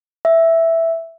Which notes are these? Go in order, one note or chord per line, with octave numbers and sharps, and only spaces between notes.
E5